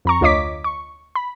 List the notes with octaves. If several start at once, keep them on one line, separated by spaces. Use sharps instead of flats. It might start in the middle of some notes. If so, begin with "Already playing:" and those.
F2 A#5 C#6
D2 F4 C#5 D#5 D6 B6
C#6
B5